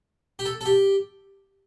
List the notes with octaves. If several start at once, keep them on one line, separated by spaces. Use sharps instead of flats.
G4
A4
A4
G4